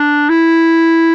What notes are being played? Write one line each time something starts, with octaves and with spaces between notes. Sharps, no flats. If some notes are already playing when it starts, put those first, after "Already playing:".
Already playing: D4
E4